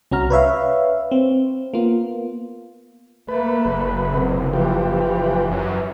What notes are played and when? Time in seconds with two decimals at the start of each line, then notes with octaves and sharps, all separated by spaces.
0.12 C2 C#4 F#4 A#5 F6
0.30 B4 C#5 E5 F5
1.11 C4
1.74 A#3 B3 F4
3.28 A3 A#3 B4
3.65 F#1
4.09 C#2 F#2 C3
4.53 E3 F3 G4
5.51 F#2